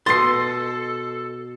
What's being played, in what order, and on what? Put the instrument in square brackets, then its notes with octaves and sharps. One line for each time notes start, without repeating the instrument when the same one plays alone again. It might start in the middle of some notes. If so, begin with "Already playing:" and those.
[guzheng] B2 D#5 [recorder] A4 [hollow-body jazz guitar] C6 [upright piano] A6 C7